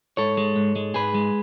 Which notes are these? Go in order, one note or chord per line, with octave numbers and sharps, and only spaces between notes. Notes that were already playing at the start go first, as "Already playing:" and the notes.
G#2 A4 C#5
G#3
G#2
G#3
G#2 G#4 B4
G#3